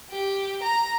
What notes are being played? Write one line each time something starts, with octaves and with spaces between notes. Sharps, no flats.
G4
A#5